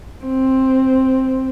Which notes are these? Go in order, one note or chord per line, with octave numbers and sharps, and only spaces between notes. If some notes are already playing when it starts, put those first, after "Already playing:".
C4